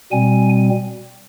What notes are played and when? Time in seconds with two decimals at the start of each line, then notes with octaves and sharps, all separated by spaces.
0.12 B2 G3 C4 G#5